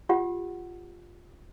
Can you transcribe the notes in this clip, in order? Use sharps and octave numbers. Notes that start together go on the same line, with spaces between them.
F4 G4 F#5